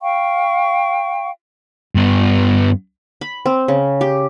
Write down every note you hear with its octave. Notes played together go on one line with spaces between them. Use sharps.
F5 G5 C#6
G2 B3
B5
C4
C#3
G4